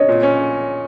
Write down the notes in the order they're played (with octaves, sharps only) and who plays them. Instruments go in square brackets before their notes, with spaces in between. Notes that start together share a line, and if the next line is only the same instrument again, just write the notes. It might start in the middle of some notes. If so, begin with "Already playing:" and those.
Already playing: [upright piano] C#5 D#5
[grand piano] A#2
C#4